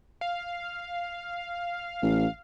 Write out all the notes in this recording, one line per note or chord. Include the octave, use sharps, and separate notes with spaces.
F5
A1